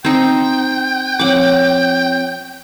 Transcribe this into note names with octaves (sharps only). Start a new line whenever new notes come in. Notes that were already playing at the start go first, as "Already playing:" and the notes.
C4 D#4 G5
F3 C4 C#5 F#5 D6